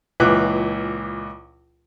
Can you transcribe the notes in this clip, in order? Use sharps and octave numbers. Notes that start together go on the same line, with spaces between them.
C#2 A#2 E3 D6 F#6